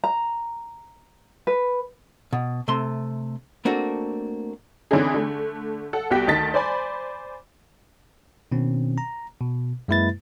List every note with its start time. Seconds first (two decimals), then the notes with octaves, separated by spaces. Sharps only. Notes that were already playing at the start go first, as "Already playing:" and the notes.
0.04 A#5
1.47 B4
2.33 B2
2.68 C3 A3 C6
3.65 A3 A#3 C4 D4 F#4
4.91 D3 E3 C4 C#4 D#4 G#4
5.14 D3 A3
5.93 A4 F#5
6.11 C2 B3 F#4 G4 G5 B6
6.27 D2 D#3 D#5 A5 A6 B6
6.54 C5 D5 G#5 B5
8.52 B2 D#3 C4 C#4
8.98 A#5
9.40 B2
9.88 F#2 G#3 A#3 E4 B4 A6